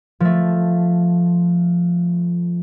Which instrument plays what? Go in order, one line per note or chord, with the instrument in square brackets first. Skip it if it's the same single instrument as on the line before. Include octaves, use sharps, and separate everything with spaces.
[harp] F3 A3